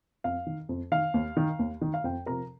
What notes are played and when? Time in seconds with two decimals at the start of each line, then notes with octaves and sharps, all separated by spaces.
0.24 F2 F5
0.47 D#3
0.69 F2
0.92 D#3 F5
1.14 D#2
1.37 D#3
1.59 D#2
1.81 D#3
1.94 F5
2.04 F2 G5
2.26 C3 F3 A#4 A#5